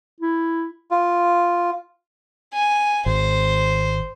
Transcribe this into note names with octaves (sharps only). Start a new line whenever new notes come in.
E4
F4
G#5
G#1 C5